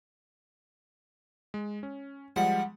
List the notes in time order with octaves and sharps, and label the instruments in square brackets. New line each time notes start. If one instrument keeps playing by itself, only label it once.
[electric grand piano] G#3
C#4
[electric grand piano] F3 G3 G#3 [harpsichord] F#5